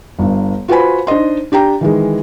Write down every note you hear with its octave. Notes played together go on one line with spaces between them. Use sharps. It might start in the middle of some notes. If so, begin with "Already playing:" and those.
G1 G2
F4 F#4 B4 C5 G#5 B5
D4 D#4 C5 D#5 C6
D4 G4 G5 A#5
D#3 E3 G#3